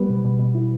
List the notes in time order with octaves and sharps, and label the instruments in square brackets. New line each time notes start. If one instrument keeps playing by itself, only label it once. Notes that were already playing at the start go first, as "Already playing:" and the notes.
Already playing: [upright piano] G3 B3
[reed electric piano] B2
B2
B2
E4